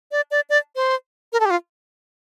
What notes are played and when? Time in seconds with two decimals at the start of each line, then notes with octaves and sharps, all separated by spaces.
0.12 D5
0.31 D5
0.50 D5
0.76 C5
1.33 A#4
1.40 A4
1.45 G4
1.50 F4